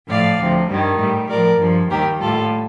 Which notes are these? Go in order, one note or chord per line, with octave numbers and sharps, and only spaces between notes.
A2 F3 D5 F5
D2 C3 F3
G2 D#3 G3
A2 G3
A2 F3 A#4 D5
G2 F3
D#2 D#3 G3 G4 A#4
A2 G3 F4 A4